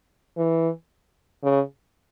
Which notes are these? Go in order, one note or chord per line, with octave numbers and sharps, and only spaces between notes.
E3
C#3